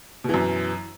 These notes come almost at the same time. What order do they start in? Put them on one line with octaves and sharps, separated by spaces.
B2 E3 F#2